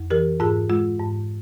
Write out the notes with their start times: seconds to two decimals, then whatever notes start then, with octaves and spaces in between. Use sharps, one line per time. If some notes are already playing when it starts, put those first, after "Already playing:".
Already playing: F2
0.10 E3 G4 A#4
0.40 G#2 F4 G#4
0.70 G#3 F4
0.99 G#2